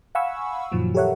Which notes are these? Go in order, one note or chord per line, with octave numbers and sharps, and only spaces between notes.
F5 F#5 G#5 B5 C#6 E6
F#2 A#2 D#3 F3 F#3
G4 A4 A#4 C#5 E5 F#5